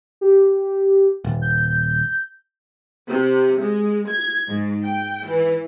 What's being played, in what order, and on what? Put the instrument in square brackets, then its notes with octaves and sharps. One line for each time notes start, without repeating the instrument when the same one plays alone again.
[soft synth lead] G4
[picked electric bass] D#1
[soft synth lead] G6
[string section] C3
G#3
G#6
G#2
G5
E3